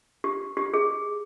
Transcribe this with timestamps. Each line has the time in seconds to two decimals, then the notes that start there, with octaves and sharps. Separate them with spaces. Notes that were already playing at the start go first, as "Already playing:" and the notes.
0.24 G4
0.57 G4
0.74 G#4